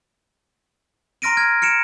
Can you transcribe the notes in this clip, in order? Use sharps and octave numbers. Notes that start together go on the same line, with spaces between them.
A#5 C6 F6 A#6 D7 D#7
F6 G#6
F6 C#7 D7 E7